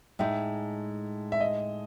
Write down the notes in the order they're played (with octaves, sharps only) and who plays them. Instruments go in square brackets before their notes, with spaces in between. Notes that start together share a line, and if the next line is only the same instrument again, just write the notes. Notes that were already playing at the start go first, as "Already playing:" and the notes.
[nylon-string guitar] A2 G#3 D#4 [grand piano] E5
[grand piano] E5
D#5